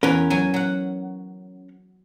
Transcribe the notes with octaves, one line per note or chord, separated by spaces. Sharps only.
E2 C#4 A#4 B4
F#3 G#5
F#3 F#5